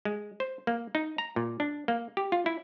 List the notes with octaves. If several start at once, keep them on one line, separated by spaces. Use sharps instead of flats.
G#3
C5
A#3
D#4
A#5
A#2
D4
A#3
G4
F4
E4